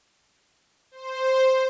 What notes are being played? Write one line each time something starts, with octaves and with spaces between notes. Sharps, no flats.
C5